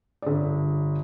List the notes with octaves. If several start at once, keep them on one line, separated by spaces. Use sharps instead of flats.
G1 D5